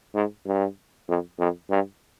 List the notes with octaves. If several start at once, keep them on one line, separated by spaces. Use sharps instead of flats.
G#2
G2
F2
F2
G2